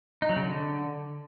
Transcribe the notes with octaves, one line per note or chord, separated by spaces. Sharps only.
D#4
F#3
C#3
D3